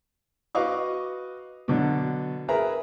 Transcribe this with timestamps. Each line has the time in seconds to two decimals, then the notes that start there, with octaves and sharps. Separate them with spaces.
0.55 F#4 B4 D#5 F5 C#6 D6
1.68 B2 D3 F#3
2.48 G#4 A#4 B4 E5 A#5